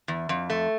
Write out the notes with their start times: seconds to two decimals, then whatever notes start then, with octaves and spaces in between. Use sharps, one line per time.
0.08 E2
0.29 F2
0.50 A3